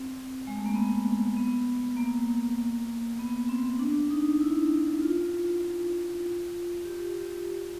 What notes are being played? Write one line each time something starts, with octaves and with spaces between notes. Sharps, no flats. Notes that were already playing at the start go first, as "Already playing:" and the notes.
Already playing: C4
G#3
A3
A#3
B3
B3
A#3
B3
C4
D4
D#4
E4
F4
G4
G4